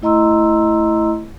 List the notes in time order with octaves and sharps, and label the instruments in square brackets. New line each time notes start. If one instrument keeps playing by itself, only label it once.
[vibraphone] A3 E4 D#5 A#5 C6 E6